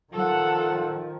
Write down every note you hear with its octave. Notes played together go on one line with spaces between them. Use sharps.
D#3 F3 A4 F#5